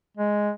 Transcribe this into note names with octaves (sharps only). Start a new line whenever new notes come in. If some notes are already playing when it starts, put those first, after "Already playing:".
G#3